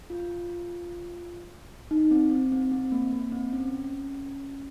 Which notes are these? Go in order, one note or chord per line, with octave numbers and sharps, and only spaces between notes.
F4
D#4
C4
C4
C4
C4
A#3
A#3
C4
C#4